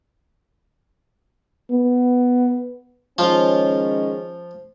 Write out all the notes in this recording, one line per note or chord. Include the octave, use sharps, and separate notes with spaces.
B3
D#3 F3 G#3 C#4 F4